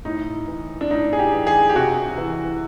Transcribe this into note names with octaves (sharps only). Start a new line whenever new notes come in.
A2 D#4
E3
D4
A2 D#4
G#4
G4
E3
G#4
G4
C3 F#4
E3